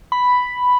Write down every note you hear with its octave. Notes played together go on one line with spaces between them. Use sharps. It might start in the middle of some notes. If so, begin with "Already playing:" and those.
B5